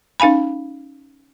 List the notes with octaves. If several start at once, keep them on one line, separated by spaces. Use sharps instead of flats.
C#4 D#4 F5 G#5 B5